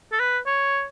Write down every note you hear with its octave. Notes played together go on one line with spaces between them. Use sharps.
A4
B4
C#5